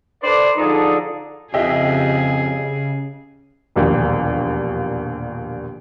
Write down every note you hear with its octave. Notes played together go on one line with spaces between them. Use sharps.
A4 B4 C5 D5
D3 F3 D4 D#4 G#4 A4
F2 C#3 G4 G#4 D#5 E5
E1 A#1 D#2